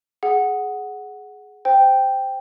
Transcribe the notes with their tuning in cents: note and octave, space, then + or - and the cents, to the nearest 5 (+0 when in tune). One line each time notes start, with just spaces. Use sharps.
G#4 +15 F#5 +0
C5 +0 G5 +0